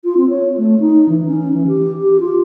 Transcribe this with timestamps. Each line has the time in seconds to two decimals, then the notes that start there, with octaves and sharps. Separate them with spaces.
0.04 F4
0.17 C4
0.29 C#5
0.57 A3
0.80 D#4
1.09 E3
1.26 C#4
1.54 E3
1.67 G4
2.03 G4
2.20 F4